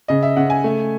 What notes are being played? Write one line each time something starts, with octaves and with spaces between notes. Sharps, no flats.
C#3 D#5
E5
C#3 F#5
G#5
A3